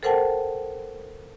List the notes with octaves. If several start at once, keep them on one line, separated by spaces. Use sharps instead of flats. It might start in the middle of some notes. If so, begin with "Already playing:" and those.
A4 A#4 C5 F#5 G5 A5